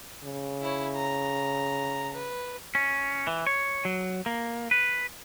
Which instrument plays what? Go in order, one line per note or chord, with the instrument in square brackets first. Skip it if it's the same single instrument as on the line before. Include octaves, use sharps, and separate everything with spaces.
[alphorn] C#3
[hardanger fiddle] E4 C#5
A#5
B4
[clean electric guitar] C#4
E3
C#5
F#3
A#3
B4